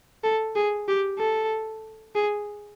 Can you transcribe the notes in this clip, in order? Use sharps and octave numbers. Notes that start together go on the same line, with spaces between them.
A4
G#4
G4
A4
G#4